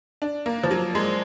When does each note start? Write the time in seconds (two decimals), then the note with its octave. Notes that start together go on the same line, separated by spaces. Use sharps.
0.22 D4
0.46 A#3
0.63 F3
0.71 F#3
0.95 G#3